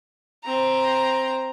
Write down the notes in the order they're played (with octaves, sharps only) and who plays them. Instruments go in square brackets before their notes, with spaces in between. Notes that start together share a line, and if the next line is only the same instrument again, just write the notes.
[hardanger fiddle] C4 A#5